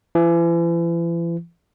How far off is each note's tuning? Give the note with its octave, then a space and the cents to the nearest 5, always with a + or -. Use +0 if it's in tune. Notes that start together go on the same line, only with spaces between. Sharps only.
E3 +40